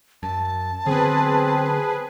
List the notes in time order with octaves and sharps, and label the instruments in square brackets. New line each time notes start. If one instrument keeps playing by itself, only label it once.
[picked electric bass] F#2 [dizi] A5
[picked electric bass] D3 F#3 B3 [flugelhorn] C4 [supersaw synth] G#4 B4